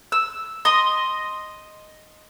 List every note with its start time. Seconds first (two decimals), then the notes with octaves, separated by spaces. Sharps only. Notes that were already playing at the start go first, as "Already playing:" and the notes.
0.12 E6
0.65 D#5 C6 D#6